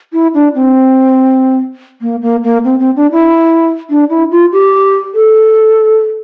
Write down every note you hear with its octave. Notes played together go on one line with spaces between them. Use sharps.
E4
D4
C4
A#3
A#3
A#3
C4
C4
D4
E4
D4
E4
F4
G4
A4